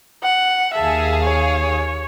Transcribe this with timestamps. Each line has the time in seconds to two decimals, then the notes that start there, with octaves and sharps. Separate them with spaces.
0.23 F#5
0.74 D#2 G#4 E5 F5 A5
1.22 C#5